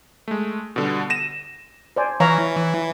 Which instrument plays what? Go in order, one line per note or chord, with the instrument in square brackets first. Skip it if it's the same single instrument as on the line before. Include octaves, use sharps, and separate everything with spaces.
[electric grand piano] G#3 A3
B2 D3 G3
A#6 D#7 E7
[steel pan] C5 D5 G#5
[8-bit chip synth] E3 [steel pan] C#5 F5 A#5